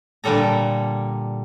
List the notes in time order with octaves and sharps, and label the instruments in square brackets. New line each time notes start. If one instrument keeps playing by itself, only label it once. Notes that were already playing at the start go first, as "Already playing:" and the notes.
[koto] A#2 D3 G3 A4 A#5